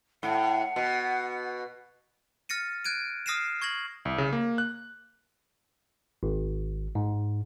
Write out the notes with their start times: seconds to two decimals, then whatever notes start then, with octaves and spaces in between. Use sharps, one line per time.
0.23 A2 F#5
0.76 B2
2.49 F6 A6 A#6 C#7 D#7
2.85 F#6 G#6 D7 D#7
3.26 D#6 F6 A#6 C7 D#7 E7
3.62 C#6 G#6 A#6 F#7
4.05 C2
4.18 C#3
4.33 A#3
4.58 F#6
6.23 G#1
6.95 G#2